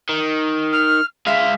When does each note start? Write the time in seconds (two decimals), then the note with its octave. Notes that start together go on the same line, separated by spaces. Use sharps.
0.09 D#3
0.73 F6
1.26 G#3 E5 F5